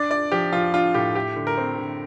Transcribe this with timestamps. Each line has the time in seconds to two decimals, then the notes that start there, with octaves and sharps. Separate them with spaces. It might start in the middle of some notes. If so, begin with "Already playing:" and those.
Already playing: D4 D5
0.10 D4 D5
0.32 F3 G4
0.52 F3 F4
0.74 D4 F4
0.94 A2 G4
1.15 A3 G4
1.36 D3
1.47 A#4
1.57 C4
1.78 D3